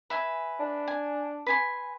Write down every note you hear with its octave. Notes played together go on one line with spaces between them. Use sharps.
B4 E5 G#5
D4
G#5
B4 G#5 C6